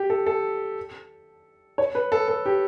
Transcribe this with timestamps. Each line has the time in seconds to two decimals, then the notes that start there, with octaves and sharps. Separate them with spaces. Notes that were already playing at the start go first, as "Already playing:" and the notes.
Already playing: G4
0.10 A4
0.27 A4
1.78 C#5
1.95 B4
2.12 A4
2.28 A4
2.46 G4